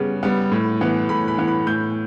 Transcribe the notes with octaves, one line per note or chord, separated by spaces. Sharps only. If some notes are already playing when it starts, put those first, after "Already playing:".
Already playing: C#3 G3 B3
G3 B3
A2
E3 B3
A2 B5
B5
E3 B3
B5
A2 G6